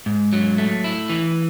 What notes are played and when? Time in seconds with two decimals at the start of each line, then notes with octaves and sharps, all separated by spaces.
0.06 G#2
0.33 F#3
0.58 A3
0.84 E4
1.10 E3